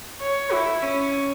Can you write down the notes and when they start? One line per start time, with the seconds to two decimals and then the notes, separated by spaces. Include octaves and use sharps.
0.22 C#5
0.52 E4
0.83 C#4